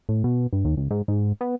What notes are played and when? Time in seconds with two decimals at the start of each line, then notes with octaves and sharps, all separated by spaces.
0.09 A2
0.24 B2
0.53 G2
0.65 D#2
0.77 C#2
0.91 G#2
1.08 G#2
1.41 B3